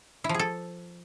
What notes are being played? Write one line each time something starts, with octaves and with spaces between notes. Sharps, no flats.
E4
F3
G#4
A4